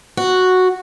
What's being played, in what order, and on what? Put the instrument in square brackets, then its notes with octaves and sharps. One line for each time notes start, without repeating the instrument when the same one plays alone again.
[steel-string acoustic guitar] F#4